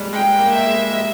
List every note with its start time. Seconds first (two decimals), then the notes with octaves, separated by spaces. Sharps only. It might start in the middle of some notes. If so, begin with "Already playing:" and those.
Already playing: G3 G#3 A#3
0.13 G#3 G5
0.39 A#3
0.53 E5
0.67 G#3
0.93 G#3